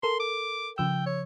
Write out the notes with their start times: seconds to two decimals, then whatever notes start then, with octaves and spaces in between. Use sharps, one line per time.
0.03 A4 A#4 C6
0.20 D6
0.78 C#3 F3 G5 E6
1.07 C#5